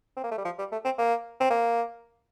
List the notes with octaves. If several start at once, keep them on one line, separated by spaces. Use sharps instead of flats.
C4
A#3
A3
G3
F3
G3
A3
C4
A#3
C4
A#3